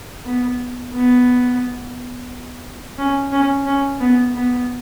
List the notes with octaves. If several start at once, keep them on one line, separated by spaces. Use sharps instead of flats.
B3
B3
C#4
C#4
C#4
B3
B3